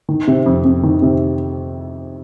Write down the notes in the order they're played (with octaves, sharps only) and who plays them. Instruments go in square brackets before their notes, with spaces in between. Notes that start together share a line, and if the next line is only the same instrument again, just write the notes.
[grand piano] D#3
C3
F2
F2
D#3
C3